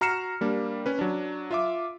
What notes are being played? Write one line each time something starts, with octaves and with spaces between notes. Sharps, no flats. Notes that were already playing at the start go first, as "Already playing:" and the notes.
F#4 A#5 F6 C7 C#7 E7
G3 A#3 D4
C#4 B4
F#3 D4
F4 E5 D6